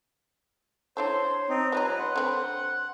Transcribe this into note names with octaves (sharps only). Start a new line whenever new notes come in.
D4 E4 A4 C5 C#5
C4 D#4
F3 G3 D#4 B4 C#5
F#5 C6
D3 C4 B4